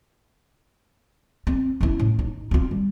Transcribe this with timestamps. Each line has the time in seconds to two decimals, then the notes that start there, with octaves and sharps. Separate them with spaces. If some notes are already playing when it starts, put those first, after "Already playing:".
1.47 C4
1.81 C#4 E4
1.99 A2
2.19 D#4
2.51 C4 F4
2.71 G3